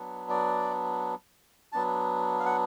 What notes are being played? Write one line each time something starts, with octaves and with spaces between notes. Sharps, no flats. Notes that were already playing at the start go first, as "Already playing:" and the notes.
Already playing: F#3 B3 D4
D5
F#3 B3 D4 A5
F5
F#5